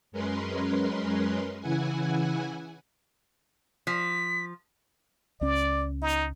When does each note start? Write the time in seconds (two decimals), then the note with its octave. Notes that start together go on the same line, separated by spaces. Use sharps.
0.12 F#2 G#3 C#4 A#4 B4 C6
1.60 C#3 E3 E4 F#5 G#5
3.87 F3 B6
5.41 C#2 C#4 D5
6.02 D#4